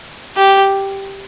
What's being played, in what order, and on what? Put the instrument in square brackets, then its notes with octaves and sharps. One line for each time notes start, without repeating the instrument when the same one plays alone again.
[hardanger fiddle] G4